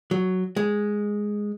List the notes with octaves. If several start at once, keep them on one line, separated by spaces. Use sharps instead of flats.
F#3
G#3